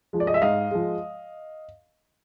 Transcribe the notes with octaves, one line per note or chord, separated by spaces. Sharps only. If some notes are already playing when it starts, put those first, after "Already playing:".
F3 G#3
D5
D#5
E5
G#2 D#5 F5
F3 G#3